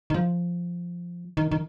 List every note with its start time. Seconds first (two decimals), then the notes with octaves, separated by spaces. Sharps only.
0.10 D#3
0.14 F3
1.37 D#3
1.51 D#3